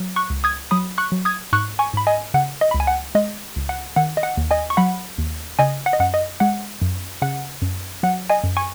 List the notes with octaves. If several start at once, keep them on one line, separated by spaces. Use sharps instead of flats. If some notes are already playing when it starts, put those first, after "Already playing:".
Already playing: F#3
C#6 F#6
C#2
D#6 G#6
F#3 B5 D#6
C#6 F#6
F#3
D#6 G#6
G#2 C#6 F#6
G#5 C#6
G#2 B5
D#5 G#5
C#3 F#5
D#5
C#2 B5
G#5
F#5
G#3 D#5
C#2
F#5
D#3 F#5
D#5
F#5
D#2
D#5 G#5
C#6
F#3 F#5 B5
D#2
C#3 D#5 G#5
F#5
D#5
F#2 F#5
D#5
G#3 F#5
F#2
C#3 F#5
F#2
F#3 F#5
D#5 G#5
F#2
G#5 C#6